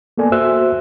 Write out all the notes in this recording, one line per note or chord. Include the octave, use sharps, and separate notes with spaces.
A#3 B3 A4 D5 G#5
F#4 C5 E5 E6 F#6